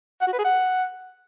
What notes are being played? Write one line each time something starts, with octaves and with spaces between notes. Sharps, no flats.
F#5
F#4
B4
G#4
F#5